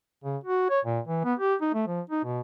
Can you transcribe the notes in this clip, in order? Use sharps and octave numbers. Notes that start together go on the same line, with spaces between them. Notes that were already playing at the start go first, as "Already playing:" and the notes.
C#3
F#4
C#5
A#2
E3
B3
G4
D#4
A3
F3
D#4
B2